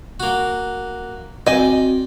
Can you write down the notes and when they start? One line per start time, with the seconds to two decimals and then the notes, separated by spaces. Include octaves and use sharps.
0.20 A#3 F#4
1.47 C4 F#4 D5 D#5 G5 G#5